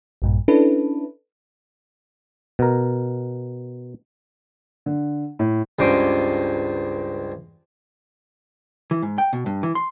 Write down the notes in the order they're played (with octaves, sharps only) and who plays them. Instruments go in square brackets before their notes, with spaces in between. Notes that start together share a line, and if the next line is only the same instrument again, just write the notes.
[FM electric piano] A#1 G2 A#2
C#4 D4 E4 A4 B4
[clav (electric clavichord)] B2 A#4
[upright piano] D3
A2
[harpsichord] C#2 G2 C5 G5 G#5 D6
[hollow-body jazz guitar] E3
G#2
G5
B2
G2
E3
C6